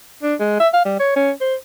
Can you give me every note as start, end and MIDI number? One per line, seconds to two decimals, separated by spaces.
0.23 0.34 62
0.40 0.58 56
0.60 0.68 76
0.74 0.83 77
0.85 1.00 55
1.00 1.14 73
1.16 1.31 61
1.41 1.55 72